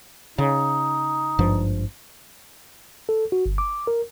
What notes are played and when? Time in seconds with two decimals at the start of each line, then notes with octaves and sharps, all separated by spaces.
0.38 C#3 D#4
1.39 G#1 G2 F3
3.09 A4
3.32 F#4
3.46 G1
3.58 D6
3.87 A#4